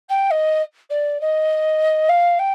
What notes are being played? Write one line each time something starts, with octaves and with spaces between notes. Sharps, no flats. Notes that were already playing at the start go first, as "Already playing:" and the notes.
G5
D#5
D5
D#5
F5
G5